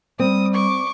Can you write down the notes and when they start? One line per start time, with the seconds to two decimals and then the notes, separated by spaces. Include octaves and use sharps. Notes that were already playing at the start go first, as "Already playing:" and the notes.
0.19 G3 C4 D#6
0.54 C#6 D6